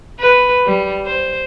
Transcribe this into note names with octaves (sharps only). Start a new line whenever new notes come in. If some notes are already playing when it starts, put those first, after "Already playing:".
B4
G3
C5